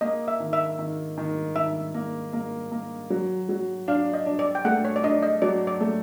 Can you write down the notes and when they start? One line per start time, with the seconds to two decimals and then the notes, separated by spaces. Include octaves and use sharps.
0.01 A#3 D#5
0.28 E5
0.40 D#3
0.53 E5
0.79 D#3
1.18 D#3
1.56 D#3 E5
1.94 A#3
2.33 A#3
2.72 A#3
3.10 F#3
3.49 F#3
3.88 D4 F5
4.14 D#5
4.26 D4
4.39 D5
4.55 G5
4.65 A3 F#5
4.85 C#5
4.96 D5
5.03 D4 D#5
5.23 D#5
5.42 F#3 D5
5.67 D5
5.80 A3